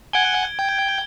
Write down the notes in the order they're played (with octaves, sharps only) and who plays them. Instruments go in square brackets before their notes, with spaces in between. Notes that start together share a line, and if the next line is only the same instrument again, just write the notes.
[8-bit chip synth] F#5 G#5 [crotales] G#6 D7 G7
[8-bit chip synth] G5